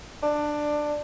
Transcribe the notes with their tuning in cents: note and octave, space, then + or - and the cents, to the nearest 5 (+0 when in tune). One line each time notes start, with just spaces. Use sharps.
D4 +15